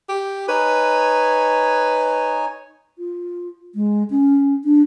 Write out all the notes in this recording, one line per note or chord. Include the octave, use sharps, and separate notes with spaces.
G4
D#4 B4 C#5 G#5
F4
G#3
C#4
D4